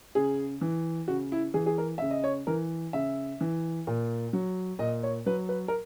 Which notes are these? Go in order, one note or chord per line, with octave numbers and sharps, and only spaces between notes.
C#3 G#4
E3
C#3 F#4
E4
E3 G#4
G#4
A#4
C#3 E5
D#5
C#5
E3 A#4
C#3 E5
E3
A#2
F#3
A#2 D#5
C#5
F#3 B4
B4
A#4